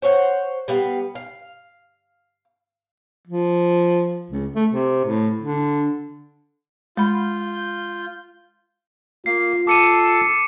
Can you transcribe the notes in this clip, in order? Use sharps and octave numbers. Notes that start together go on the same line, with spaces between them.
C5 C#5 E5 F#5
G3 B3 F5
F5
F3
C#2
A3
C3
A2
D3
G#3 F4 B5 G6
A#3 F4 C7
A4 A5 D6 C#7 D#7